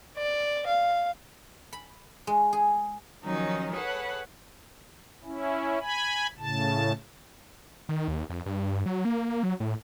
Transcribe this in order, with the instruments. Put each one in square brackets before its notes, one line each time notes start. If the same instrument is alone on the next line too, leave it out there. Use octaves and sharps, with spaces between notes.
[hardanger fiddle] D5
F5
[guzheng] B5
G#3
G#4
[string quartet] D#3 F3 F#3 C#4 D#4
G#4 A4 B4 C#5 F#5
[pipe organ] C#4 E4
G#5 B5
A2 C#3 A5
[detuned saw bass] D#3
D#2
F2
G2
F#3
A#3
F#3
A2